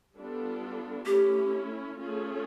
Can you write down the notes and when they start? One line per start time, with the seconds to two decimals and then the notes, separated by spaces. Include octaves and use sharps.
0.15 G3 B3 D4 F4 A4
1.06 A3 C#4 E4 G4
1.98 A3 C#4 F4 G#4